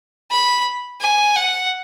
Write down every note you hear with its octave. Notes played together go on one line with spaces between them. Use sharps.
B5
G#5
F#5